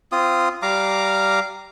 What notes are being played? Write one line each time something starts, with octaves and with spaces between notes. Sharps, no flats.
C4 F4 D#6
G3 F5 A#5 D6